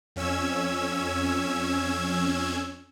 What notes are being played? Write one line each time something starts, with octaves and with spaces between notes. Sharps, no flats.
F2 C#4 E6 G#6